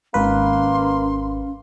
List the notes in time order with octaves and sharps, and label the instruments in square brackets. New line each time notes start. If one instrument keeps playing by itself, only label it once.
[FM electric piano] G#1 B4 [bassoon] A#3 [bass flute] C#4 [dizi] C6